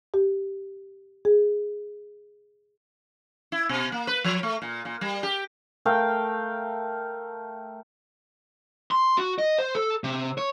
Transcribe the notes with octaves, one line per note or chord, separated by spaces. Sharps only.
G4
G#4
E4
B2
A#3
B4
F3
A3
A#2
A#2
G3
G4
A3 A#4 F5 G5
C6
F#4
D#5
C5
A4
C3
C#5